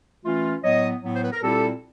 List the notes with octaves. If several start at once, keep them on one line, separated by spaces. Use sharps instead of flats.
E3 A3 C#4 F4
A2 F#3 B3 C#5 D#5
A2 F#3 B3
C5
B4
A#4
A#2 G3 C4 E4 G4 A4